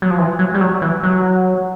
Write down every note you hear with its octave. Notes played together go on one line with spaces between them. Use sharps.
F#3
F3
E3
F#3
G3
F#3
E3
F#3